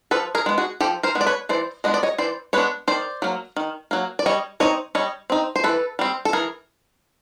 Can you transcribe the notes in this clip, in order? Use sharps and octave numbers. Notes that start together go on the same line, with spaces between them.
F3 A4 B4
G#4 A#4
G#3 B3
F#4 G#4
F3 G4 A4
A#4 C5
G#3 B3
D5
B4 C#5
E3 C5 D5
G#3 B3 D4 D#5
D5
C#5 D#5
E3 C5 D5
G#3 B3 D4 B4 C#5
D#3 C5 D5
F#3 A#3
D#3
F#3 A#3
D5
G3 C#5 D#5
C4 D#4 C#5 D#5
G3 C#5 D#5
C4 D#4
C5
E3 A4 B4
G3 C4
A4
E3 G#4 A#4